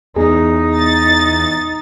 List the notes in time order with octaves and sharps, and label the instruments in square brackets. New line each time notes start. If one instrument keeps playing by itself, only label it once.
[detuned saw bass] E2 [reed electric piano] B3 G#4 [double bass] D#4
[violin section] A6